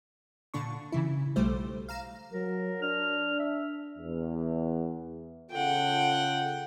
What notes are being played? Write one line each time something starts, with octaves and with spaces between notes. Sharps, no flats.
A#2 D3 D4 C#6
C#3 E3 E4
B1 G3 A3 C5
F5 A#5 E7
F#3 A#4
D4 F6
E5
E2
C#3 F4 A4 F#5 G5